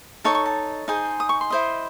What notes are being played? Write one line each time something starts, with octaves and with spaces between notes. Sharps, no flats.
D#4 A4 C#5 C#6
C#6
A5
D#4 G#4 C5
D#6
C#6
C6
E4 C5 D#5